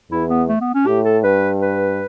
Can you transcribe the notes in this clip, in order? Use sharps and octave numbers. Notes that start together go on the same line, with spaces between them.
E2 E4
B3
A3
B3
C#4
A2 G4
A4
G2 B4
B4